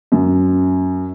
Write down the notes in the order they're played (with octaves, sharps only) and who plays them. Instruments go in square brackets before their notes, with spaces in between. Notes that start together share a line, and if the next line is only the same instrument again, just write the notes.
[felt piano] F#2